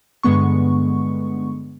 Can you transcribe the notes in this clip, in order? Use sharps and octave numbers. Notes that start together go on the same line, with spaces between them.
G2 D3 G#3 B3 C#6